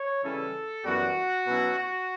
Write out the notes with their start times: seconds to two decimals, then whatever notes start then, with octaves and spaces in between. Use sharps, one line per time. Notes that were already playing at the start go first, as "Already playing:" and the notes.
Already playing: C#5
0.23 C#3 E3 G3 C#4 E4 A4
0.85 F#2 E3 G3 B3 F#4
1.46 B2 F#3 C#4 E4
1.77 F#4